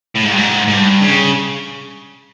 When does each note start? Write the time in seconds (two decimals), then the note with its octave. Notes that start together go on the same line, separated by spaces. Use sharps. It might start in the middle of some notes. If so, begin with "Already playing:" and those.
0.15 A2
0.23 G#2
0.31 G2
0.37 G#2
0.67 G#2
0.73 G2
1.02 C#3